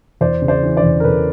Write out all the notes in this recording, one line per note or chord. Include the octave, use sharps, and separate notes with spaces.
E2 C5 D5
C#3
C5 D5
E3
C5 D5
E2
A#4
E2 A4 B4